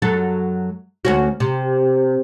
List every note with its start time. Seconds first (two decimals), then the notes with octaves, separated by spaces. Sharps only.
0.02 F#2 F#3 A4
1.05 D2 C#4 F#4
1.40 C3